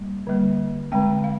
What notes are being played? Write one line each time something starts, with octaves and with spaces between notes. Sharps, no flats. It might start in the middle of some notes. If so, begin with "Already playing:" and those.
Already playing: G3 A#3
D3 G3 A#3
D3 G#3 C4 G5
F5